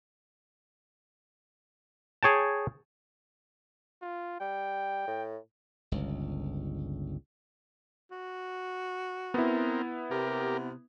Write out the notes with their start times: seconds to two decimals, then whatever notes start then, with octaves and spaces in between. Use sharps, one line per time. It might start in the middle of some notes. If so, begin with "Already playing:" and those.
2.23 G#4 C#5 G5 A5
4.02 F4
4.40 G3 G5
5.07 A2
5.92 G1 C#2
8.11 F#4
9.34 B3 C4 E4 A#4
10.11 C3 G4 A#4